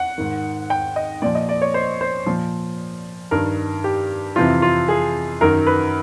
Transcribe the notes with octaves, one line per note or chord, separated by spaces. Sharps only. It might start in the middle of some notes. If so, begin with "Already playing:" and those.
Already playing: F#5
G#2 D#3
G5
D#5
A#2 F3 D5
D#5
D5
C#5
C5
C5
A#2 F3
G2 D#3 A#4
G4
F2 C3 E3 F4
F4
G#4
F#2 D#3 A#4
B4